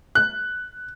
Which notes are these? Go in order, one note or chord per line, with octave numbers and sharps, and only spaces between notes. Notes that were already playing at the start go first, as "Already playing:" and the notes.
F#6